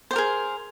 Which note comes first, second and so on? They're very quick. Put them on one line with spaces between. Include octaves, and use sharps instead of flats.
C5 G4 A#4 G#4